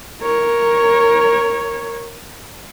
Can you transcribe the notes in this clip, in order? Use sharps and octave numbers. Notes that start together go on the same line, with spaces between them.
A#4 C#5